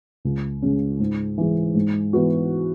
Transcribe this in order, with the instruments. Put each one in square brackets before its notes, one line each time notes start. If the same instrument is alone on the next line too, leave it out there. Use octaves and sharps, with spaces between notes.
[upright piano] C#2
C#3 G#3 C#4
G#2
E3 G#3
G#2
E3 B3 F#4